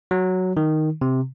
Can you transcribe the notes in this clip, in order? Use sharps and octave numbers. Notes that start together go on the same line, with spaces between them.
F#3
D#3
C3